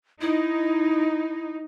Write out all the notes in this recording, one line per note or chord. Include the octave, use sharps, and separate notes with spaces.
D#4 E4